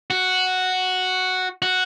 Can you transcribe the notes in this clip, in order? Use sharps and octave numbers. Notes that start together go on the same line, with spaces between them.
F#4
F#4